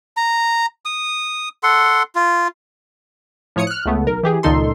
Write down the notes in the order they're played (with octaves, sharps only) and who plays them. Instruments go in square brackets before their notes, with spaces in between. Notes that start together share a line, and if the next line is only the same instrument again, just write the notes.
[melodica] A#5
D#6
A4 F#5 C6
F4
[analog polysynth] A2 F3 C#5 D#6 C#7
F6 F#6
C#2 C#3 A3 B3
B1 A#4
E3 G4 G#4
C#2 A#2 D#3 D#4 A4 C6